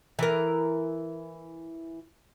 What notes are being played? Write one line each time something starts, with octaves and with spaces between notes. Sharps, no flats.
E3 A#4